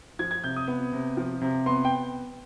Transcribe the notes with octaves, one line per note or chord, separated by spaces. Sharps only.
F3 G#6
G#6
C3 G6
D#6
B3
C3
F3
C3
B3 C6
G5